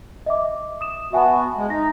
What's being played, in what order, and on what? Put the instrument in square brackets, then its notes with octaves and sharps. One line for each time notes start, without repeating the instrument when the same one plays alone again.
[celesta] D#5 E5 D6
D#6 E7
[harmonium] B3 F#4 [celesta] E5 G#5 A5
[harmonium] G#3
[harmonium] D#4 [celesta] A#6